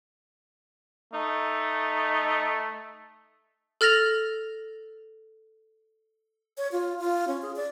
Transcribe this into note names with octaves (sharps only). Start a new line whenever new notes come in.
A3 D#4
A4 F6 A6 A#6 F7
C#5
F4
F4
C#4
G#4
D5